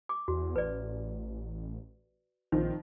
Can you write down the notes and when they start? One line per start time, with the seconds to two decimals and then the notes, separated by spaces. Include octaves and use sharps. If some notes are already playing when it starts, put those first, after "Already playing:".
0.09 D6
0.28 E2 F#4
0.56 A1 B4 D5
2.52 A#1 D#3 F3 C4